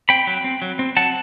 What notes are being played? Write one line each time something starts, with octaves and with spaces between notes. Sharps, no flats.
C4 G5 B5
F#3
C4
F#3
C4
F#3 F#5 A5